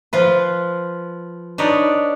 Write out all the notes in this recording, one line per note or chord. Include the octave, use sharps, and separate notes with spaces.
F3 F4 B4
D4 D#4 B4 C#5 D5